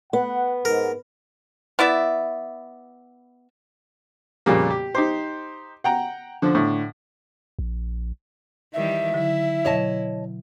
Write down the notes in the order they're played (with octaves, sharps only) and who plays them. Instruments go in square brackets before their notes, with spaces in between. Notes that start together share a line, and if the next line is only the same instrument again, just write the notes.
[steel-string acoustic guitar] B3 [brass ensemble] F#5
[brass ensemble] G#2 [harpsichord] A#4
[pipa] B3 E4 D5 E5
[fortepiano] F2 A#2 C#3 G3 A#3
G4
D#4 G4 C5
F#5 G5 A#5
D3 F3
A2 D3
[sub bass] A#1
[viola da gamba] D#3 E3 G3 [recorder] E5
[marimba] D3 F#3 [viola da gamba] E4
[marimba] B2 F#3 [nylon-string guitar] C#5 D#5 A5